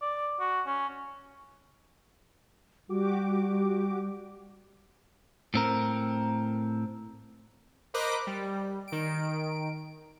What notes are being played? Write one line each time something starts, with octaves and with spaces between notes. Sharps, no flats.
D5
F#4
C#4
G3 F#4 G4 D6
A2 C4 A#4
A#4 C5 D#5 B5 D6 F#6
G3
D#3 D7